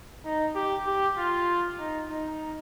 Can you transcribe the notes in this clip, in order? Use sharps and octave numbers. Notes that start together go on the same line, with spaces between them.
D#4
G4
G4
F4
D#4
D#4